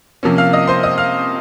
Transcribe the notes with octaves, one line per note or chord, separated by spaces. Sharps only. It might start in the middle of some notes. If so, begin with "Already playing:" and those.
C3 F3 A#3 C#4
F5 F6
D#5 D#6
C5 C6
D#5 D#6
F5 F6